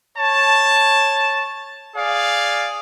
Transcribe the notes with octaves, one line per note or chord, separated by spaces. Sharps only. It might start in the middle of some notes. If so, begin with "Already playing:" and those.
C#5 A5
G#4 D5 F5